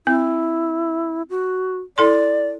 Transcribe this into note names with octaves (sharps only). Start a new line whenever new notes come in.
C4 E4
F#4
E4 A4 D5 C6